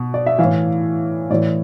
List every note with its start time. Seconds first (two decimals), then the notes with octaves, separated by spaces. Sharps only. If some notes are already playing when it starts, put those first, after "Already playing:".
Already playing: B2
0.14 D5
0.26 E5
0.39 A2 E3 F5
1.30 A2 D5
1.34 E3